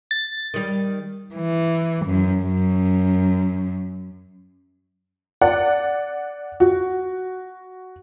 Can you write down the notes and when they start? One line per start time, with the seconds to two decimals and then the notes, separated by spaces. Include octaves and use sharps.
0.11 A6
0.54 D#3 G3
1.35 E3
2.06 F#2
2.43 F#2
5.41 D5 F#5
6.60 F#4